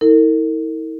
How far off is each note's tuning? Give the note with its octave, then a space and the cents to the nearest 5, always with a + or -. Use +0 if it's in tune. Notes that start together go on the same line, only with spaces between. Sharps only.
E4 -45 A#4 -45